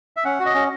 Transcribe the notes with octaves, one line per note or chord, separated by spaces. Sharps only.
E5
C#4 F#5
F#4
D#5
C#4